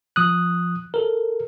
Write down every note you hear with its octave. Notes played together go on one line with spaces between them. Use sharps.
F3 D#6 F#6
A4 A#4